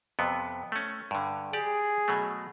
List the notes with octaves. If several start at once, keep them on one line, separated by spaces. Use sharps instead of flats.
F2 C3 B3
A3 C#4
G2 D3
G4 G#4 D5
B2 F#3 A3